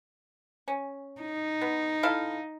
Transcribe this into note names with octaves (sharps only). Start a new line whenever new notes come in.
C#4
D#4
B3
E4 A4 F5